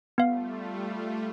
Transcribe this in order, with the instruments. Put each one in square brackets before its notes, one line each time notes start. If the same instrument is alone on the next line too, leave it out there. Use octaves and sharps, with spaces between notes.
[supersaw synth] G3 A3 F4 [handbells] B3 F5